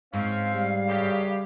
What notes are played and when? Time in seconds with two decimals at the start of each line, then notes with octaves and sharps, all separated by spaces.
0.13 G#2 C4 C#4 F5
0.54 G3
0.88 F#2 C#3 G4